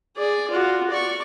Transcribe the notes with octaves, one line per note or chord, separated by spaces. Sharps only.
G#4 D5
F4 F#4
D5 C#6